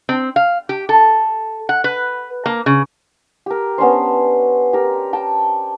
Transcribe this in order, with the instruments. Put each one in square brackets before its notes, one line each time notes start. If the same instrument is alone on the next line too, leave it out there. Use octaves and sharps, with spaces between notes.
[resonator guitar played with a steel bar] C4
F5
G4
A4
F#5
B4
A#3
C#3
[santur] G4 A#4
B3 C#4 D4 C5
G4 A#4
G5 A5